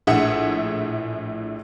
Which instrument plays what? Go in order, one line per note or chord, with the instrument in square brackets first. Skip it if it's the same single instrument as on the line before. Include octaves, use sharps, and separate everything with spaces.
[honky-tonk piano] A#1 A2 D4 G#4 E5 F#5